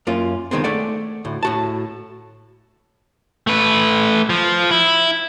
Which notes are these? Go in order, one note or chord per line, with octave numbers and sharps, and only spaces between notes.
F#2 A#3 C#4 F4
C#2 A2 D#3 G#3 B3 C4
A3 A4 D5 F#5
D2 A2
A2 F#4 A5
A3 B4
F3
E4